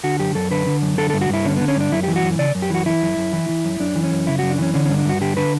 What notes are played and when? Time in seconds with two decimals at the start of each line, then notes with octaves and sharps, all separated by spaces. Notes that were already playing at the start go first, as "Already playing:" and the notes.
0.04 D3 F#4
0.19 F#2 G4
0.35 F#2 A4
0.51 D3 B4
0.66 D3
0.82 F#2
0.98 D3 A4
1.10 G2 A4
1.21 F#4
1.29 G2 E4
1.45 D3 C#4
1.57 D3 B3
1.68 C#4
1.76 G2 D4
1.92 F#2 E4
2.03 E3 G4
2.16 F#4
2.23 F#2
2.39 C#3 D5
2.55 F#2
2.62 G4
2.70 E3 F#4
2.86 E3 E4
3.02 F#2
3.17 F#2
3.33 E3
3.49 E3
3.65 F#2
3.80 F#2 D4
3.96 E3
4.04 C#4
4.11 F#2
4.27 C#3 E4
4.39 F#2 F#4
4.50 D4
4.58 E3 C#4
4.74 D3 C#4
4.86 G2 C#4
4.98 D4
5.05 G2 F#4
5.21 D3 G4
5.37 D3 B4